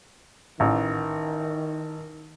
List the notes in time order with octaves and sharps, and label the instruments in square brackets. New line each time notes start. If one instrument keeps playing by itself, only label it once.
[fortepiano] A1 [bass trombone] D#3